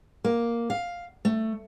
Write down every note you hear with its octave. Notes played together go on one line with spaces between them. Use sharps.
A#3
F5
A3